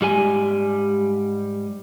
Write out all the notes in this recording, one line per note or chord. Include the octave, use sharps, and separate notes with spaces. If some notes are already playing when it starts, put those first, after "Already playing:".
G#2 G3 G#4 G#5